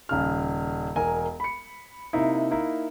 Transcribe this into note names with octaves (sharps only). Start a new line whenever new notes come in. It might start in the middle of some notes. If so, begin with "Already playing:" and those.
D#1 C#3 F6
E1 A#4 G#5
B5 C#7
C3 A#3 D#4 E4
A#3 D#4 E4